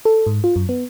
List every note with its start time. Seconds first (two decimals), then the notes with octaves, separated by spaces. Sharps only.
0.05 A4
0.27 G#2
0.44 F4
0.56 F#2
0.69 B3